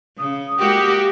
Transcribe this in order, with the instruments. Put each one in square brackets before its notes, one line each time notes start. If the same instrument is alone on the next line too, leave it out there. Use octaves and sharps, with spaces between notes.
[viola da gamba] C#3 [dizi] D#6
[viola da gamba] G#3 A#3 F#4 [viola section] G4